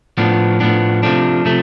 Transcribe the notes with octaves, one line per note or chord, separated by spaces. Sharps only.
A2 F3 B3 D4
A2 F3 B3 D4
C3 F3 A3 D4
C3 F3 A3